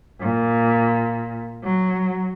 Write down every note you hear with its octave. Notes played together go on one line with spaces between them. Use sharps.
A#2
F#3